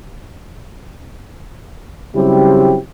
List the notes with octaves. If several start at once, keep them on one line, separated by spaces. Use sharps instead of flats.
C#3 F#3 G3 C4 E4 G4